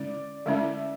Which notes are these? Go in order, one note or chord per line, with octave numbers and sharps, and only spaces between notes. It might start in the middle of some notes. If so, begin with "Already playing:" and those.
Already playing: D3 G#3 C#4 E4 D5
D3 G#3 C#4 E4 E5